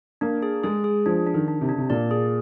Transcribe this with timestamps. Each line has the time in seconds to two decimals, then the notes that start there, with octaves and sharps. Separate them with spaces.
0.21 A#3 D4
0.42 G#4
0.64 G#3 G#4
0.84 G#4
1.06 F3 D4
1.27 D4
1.34 D#3
1.48 D4
1.61 C3
1.69 D3 D4
1.78 C3
1.90 A#2 D5
2.11 G#4